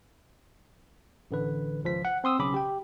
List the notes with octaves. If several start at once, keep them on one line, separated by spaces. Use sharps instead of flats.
A1 D3 B4
G#1 C#2 F3 B6
F#5
C4 C6 D#6 E6
B1 C#3 C#4 B5 D6
G4 G5